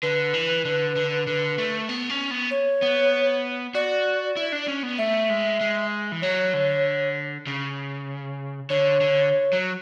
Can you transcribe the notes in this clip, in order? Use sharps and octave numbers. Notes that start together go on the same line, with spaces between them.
D3 B4
E3
D3
D3
D3
A3
B3
C#4
B3
C#5
B3
F#4 D5
E4
D4
C#4
B3
A3 E5
G#3
G#3
E3
F#3 C#5
D3
C#3
D3 C#5
D3
F#3